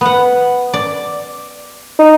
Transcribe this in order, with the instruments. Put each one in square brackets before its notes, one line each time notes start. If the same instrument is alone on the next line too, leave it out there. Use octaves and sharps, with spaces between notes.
[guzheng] B3 F#5
D5
[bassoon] D#4